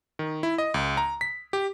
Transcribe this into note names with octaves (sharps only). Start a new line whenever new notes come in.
D#3
E4
D#5
C#2
A#5
B6
G4